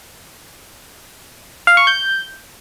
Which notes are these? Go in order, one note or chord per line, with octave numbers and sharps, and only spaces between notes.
F5
C#6
G6